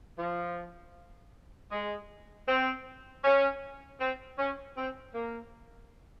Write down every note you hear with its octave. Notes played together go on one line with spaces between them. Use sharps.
F3
G#3
C4
C#4
C4
C#4
C4
A#3